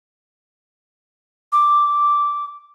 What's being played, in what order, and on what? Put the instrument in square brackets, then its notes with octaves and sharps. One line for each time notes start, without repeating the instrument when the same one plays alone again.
[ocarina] D6